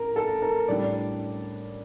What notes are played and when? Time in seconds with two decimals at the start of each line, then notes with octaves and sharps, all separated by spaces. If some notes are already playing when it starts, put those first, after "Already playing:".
Already playing: A1 A#4
0.16 A4
0.42 A#4
0.68 A2 G3 D4 D5